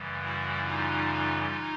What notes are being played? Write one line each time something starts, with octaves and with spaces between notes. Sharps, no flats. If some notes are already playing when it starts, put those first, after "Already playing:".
Already playing: F#2 C#3 E3 G3
E4 F#4
D#4 F4
D#4 F4